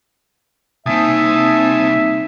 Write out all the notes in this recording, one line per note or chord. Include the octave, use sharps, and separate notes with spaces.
C2 A#3 C4 D#4 E5 G#5 A5 D#6